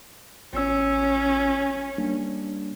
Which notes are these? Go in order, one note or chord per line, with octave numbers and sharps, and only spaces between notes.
A1 C#4 E6
G3 A#3 D4